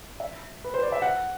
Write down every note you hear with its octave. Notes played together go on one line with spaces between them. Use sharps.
E5
B4
C5
D5
E5
F#5